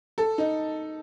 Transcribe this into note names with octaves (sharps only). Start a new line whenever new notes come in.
A4
D#4